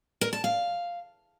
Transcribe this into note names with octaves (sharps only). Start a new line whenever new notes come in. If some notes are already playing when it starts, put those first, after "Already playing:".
A#4
A5
F5